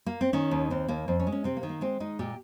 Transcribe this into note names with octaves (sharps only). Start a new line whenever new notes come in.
A#3
C4
D#3 C#4
D#2
D#2 C4
D#2 A#3
F2 C4
C#4
G#3
C#4
C3 C4
A#3
D#3
A#3
G#3 C4
G#3 D#4
A#2 G4